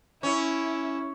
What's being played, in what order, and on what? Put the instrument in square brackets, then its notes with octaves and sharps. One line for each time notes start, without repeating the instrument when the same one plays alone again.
[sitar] C#4 [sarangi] E4